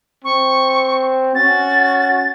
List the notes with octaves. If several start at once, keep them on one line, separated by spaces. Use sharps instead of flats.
C4 C#6
C#4 F#4 A6